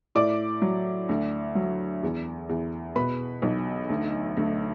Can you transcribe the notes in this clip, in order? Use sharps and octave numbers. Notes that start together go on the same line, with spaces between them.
A2 D5 D6
F#3
D2
F#3
E2
E2
B2 B4 B5
B1
D2
D2